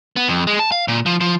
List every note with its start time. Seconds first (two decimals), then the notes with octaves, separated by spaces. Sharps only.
0.16 B3
0.28 F2
0.47 G#3
0.59 A5
0.72 F5
0.88 A#2
1.06 F3
1.21 F3